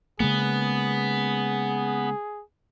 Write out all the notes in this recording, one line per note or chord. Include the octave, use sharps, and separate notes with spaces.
C#3 G#3 A#3 B3 G#4